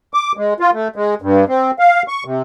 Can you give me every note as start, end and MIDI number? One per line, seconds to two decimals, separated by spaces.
0.14 0.32 86
0.37 0.54 56
0.60 0.71 65
0.73 0.88 57
0.96 1.15 56
1.22 1.45 43
1.48 1.71 60
1.79 2.03 77
2.08 2.24 85
2.25 2.42 48